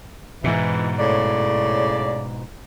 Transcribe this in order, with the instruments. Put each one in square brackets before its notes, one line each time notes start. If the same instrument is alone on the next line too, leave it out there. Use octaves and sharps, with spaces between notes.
[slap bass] G#2 B2 [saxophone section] E3
[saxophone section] A2 C#3 D5